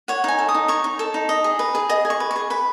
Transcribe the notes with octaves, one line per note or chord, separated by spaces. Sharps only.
C#5 F#5
D#4 G#5
A4
D#6
D#4
C#5 C#6
D#4
A4
D#4
D#5
G#4
B4
G#4
D#5 D#6
G#4
C#6
B4
C#6
G#4
B4 B5